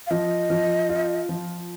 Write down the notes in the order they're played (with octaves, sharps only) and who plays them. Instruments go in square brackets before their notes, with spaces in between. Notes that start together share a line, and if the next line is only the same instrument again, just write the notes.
[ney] F5
[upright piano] F3 [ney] D#5
[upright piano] F3
F4
F3